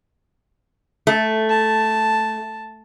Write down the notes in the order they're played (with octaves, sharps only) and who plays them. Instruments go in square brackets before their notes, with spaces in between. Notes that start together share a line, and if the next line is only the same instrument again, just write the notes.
[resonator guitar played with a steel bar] A3
[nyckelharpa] A5